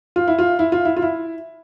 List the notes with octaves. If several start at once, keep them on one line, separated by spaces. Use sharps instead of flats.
F4
E4
F4
E4
F4
E4
F4
E4